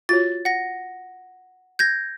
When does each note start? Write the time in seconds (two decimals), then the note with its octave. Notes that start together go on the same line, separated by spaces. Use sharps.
0.09 F4 F#4 C#5 A6
0.45 F#5 A#6
1.79 G6 G#6 A#6